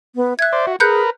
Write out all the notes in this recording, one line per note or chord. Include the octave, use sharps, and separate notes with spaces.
B3
E5 F#6 G#6
C5 D5
F#4
G#4 A#4 B4 F#6 G6 C#7